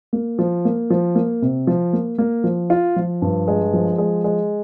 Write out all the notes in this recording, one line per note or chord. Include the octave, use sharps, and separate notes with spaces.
A#3
F3
A#3
F3
A#3
C3
F3
A#3
A#3
F3
F4
F3
G2
G#3
F3
G#3
G#3